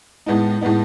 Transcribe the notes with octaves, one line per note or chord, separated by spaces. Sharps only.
A2 G#3 B3 D#4
A2 G#3 B3 D#4